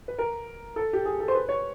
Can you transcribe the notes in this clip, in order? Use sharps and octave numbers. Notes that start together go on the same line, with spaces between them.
B4
A#4
A4
G4
G#4
A4
C5
B4
C#5